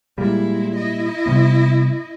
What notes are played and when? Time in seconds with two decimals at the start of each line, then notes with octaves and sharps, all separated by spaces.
0.18 A#2 G3 G#3 E4
0.76 E4 D#5
1.26 C3 G3 B3